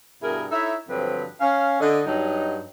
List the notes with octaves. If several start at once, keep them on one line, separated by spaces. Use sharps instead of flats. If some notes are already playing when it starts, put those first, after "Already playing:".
G2 B2 E4 G#4 A#4
D#4 E4 A4 C#5 E5
G2 D3 F3 F#3 C4 B4
C#4 F5
D3 D#5
G2 F#3 D#4